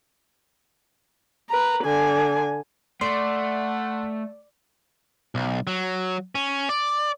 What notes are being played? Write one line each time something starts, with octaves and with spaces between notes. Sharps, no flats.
B4 A#5
D3 G#5
A3 D5 F#5 C6
B1
F#3
C#4
D5